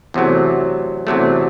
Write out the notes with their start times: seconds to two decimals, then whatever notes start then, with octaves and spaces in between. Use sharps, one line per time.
0.14 E2 C3 F#3 A3
1.07 E2 C3 F#3 A3